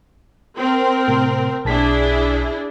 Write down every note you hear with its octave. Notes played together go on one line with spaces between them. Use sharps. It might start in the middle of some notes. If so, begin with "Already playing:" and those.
C4 A#4
A2 C3
B1 D4 E4 G#4 A5 B6